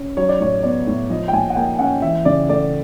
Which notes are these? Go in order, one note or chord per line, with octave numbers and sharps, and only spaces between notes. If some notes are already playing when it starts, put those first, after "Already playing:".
Already playing: C#4
F#3 C#5
D5
A2 C#5
B3 D5
A2
F3 D#5
G5
A#2 G#5
F#5
A#3 G5
C#4 F#5
E3 E5
C#3 D5
A3 D5